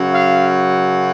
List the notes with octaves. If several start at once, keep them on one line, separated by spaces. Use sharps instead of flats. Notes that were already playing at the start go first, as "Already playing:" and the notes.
Already playing: F#2 C#3 F#3
F5